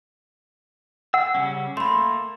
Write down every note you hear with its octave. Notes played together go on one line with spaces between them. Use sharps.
F#5 E6
C#3 G3 C#4
A3 A#3 B5 C6